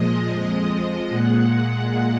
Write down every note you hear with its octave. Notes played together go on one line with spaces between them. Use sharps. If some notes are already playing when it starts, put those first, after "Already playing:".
Already playing: A#2 F3 G#3 D#5
F2 F3 G#3
A#2 G#3 F#5
F#5